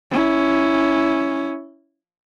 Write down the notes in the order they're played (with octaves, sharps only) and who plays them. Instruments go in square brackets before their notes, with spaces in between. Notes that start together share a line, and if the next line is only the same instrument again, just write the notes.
[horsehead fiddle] C#4 E4